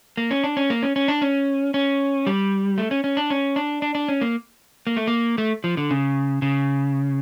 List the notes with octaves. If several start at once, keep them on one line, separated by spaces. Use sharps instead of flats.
A#3
C#4
D4
C#4
A#3
C#4
C#4
D4
C#4
C#4
G3
A3
C#4
C#4
D4
C#4
D4
D4
D4
C#4
A#3
A#3
A3
A#3
A3
F3
D3
C#3
C#3